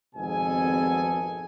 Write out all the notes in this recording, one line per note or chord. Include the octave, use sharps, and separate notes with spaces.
G#1 F2 B2 G#4 A4 G#5